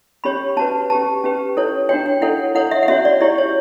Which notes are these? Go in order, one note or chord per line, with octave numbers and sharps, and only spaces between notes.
C#4 G4 C#5 B5
C#4 F#4 B4 A5
C#4 G4 B4 A5
C#4 G4 B4
C#4 E4 A4 C#5
D4 F#4 C#5 G5
G5
E4 A4 C#5 F#5
E4 A4 C#5 F#5
E5
F#5
C#4 F#4 C#5 E5
D5
E4 G4 C#5 D5
C#5